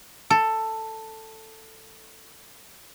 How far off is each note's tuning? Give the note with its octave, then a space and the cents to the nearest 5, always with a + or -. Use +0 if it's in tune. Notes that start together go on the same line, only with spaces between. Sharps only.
A4 +10